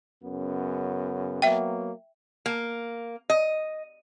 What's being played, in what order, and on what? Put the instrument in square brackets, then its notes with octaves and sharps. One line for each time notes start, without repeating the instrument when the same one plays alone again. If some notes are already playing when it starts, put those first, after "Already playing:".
[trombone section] F#2 C#3 B3
[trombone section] F#3 A#3 B3 [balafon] E5 G5
[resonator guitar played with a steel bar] A#3
D#5